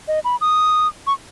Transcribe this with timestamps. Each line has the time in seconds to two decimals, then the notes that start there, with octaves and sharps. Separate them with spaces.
0.08 D#5
0.25 B5
0.41 D#6
1.07 C#6